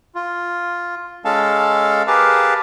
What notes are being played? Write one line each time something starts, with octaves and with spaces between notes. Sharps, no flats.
F4
G#3 C#4 A4 F5 A5
G4 G#4 A#4 B4 F5 A5